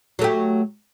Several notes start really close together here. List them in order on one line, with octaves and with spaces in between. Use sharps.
F#3 A3 G4